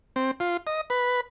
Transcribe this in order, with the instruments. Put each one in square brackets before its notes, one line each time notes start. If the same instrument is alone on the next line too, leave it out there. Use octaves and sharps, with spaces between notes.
[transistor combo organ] C4
F4
D#5
B4